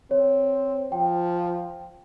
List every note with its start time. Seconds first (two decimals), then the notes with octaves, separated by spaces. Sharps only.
0.11 C4 C#5
0.92 F3 G5